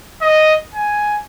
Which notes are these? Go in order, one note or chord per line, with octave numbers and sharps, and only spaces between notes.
D#5
G#5